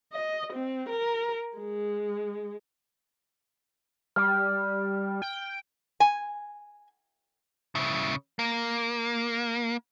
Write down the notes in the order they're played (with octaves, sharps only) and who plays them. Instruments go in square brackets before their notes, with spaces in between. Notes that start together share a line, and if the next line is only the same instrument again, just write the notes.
[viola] D#5
C4
A#4
G#3
[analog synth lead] G3 [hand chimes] F6
[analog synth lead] G5
[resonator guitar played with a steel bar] G#5
[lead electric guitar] C#3 E4
A#3